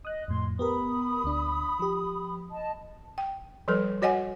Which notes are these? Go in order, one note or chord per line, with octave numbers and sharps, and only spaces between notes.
D#5 D#6 F#6
F2 A2 C6
B3 G4 A#4 B5 D#6
D2 D4
F3 G4
D#5 A5
G5
F3 G3 A4 B4
F#4 C#5 D#5 F#5 G#5